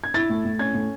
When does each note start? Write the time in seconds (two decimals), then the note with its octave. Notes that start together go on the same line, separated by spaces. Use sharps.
0.04 G#6
0.14 E4 A6
0.30 A2
0.45 A2
0.59 C#4 G#6
0.74 A2